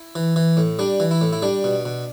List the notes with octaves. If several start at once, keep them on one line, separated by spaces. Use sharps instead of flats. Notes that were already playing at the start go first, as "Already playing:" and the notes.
Already playing: E4
E3
E3
A2
G3 D4
E3
E4
A2
E4
G3 D4
B2
B2